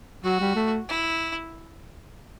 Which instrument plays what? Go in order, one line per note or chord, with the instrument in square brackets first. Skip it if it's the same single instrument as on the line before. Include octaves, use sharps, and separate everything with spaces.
[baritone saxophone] F#3 [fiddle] F#4
[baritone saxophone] G3
A3
[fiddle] E4